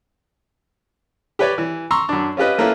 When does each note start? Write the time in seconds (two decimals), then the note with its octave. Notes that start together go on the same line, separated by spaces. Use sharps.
1.39 G4 B4 C#5 D5
1.58 E3
1.91 A#5 C6 C#6 E6
2.09 F#2 D4
2.37 C#4 F4 G4 B4 D#5
2.58 A3 A#3 C#4 E4 F4 B4